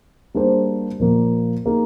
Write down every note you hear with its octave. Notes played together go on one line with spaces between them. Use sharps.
G3 A#3 D4 G#4 C5
A#2 F3 A#3
A#3 D#4 G#4